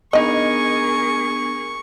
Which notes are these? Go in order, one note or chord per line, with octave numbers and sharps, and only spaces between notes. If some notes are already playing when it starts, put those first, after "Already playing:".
B3 D4 D#4 G#4 A#4 D#5 C#6